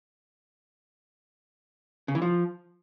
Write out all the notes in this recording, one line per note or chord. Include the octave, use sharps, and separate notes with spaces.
C#3
E3
F3